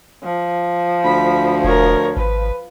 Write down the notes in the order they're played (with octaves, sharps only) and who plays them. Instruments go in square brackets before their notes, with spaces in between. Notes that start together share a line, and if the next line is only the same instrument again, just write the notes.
[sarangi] F3
[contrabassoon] D2 [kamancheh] B5
[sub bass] E1 [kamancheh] A#4 C#5
[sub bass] G#1 [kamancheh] B4